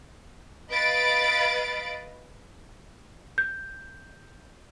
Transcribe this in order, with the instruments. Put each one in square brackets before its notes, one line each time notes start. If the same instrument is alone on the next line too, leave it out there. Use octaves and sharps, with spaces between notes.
[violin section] B4 D#5 F5 B5 A6 D7
[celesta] G6